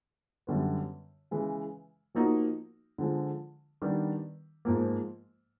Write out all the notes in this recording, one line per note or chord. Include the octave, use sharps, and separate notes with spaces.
F#2 D3 G3 B3
C#3 E3 G#3
F3 A#3 D#4 F#4
D3 F3 G#3
D#3 G3 B3 D4
G#2 F3 A#3